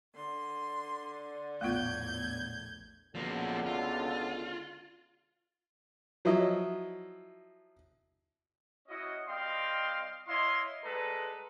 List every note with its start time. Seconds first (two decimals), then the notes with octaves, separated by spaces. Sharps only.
0.15 D3 C6
1.61 A#1 E2 A2 A3 B3 F4 G6 G#6
3.15 C#2 B2 D3 F3 A#3
3.66 F4
6.25 F3 F#3 E4 D#5
8.88 C#4 E4 F#4 D#5
9.28 G3 C4 D#5 F5 G5 C6
10.28 E4 C#5 D#5 F5 C6
10.84 G3 G#3 A4 B4 A#5